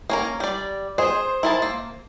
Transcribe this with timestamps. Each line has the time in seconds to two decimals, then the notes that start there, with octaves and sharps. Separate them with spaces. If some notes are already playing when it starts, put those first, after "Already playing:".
0.10 A#3 C#4 A#4
0.40 G3 D5
0.98 G#4 C5
1.43 E4 A#4 A5
1.62 A#3